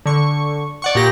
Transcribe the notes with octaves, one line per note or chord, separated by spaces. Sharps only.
D3 C#6
D5 F#5 C#6
A#2 G4 A#6